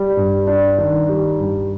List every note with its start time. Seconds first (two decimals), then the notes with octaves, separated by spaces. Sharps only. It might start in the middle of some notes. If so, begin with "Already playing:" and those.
Already playing: G3
0.17 G2
0.47 D4
0.78 D#3
1.09 G3
1.40 G2